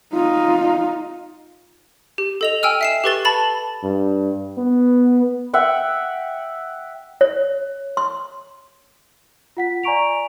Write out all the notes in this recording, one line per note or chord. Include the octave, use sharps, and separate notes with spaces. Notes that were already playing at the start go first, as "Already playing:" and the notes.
D#4 F4
G4
A4 D#5 F7
G5 G#5 E6 F6
E5 C7 E7
G4 A4 B4 C#6 A6 G7
A5 B5 A6 F#7
G2
B3
E5 F#5 G5
C#5
C6
F4 F#5 B6
D5 G#5 A#5 C#6 D7 F7